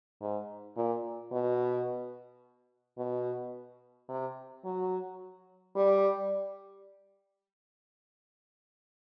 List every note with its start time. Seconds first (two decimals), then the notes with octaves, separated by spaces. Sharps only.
0.21 G#2
0.77 A#2
1.32 B2
2.98 B2
4.09 C3
4.65 F#3
5.76 G3